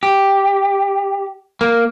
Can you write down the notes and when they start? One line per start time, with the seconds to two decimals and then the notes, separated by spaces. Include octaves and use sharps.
0.03 G4
1.61 A#3